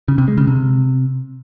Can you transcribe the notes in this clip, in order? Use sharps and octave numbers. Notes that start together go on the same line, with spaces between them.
C#3
C3
G#3
C#3
C3